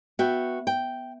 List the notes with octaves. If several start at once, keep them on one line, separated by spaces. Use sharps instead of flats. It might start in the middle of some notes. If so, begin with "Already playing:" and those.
B3 F#4 E5 G5
G5